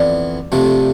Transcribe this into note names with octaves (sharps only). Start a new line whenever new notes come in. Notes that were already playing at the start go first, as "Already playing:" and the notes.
Already playing: F2 E3 B3 D5
F2 C3 F3 A3 D4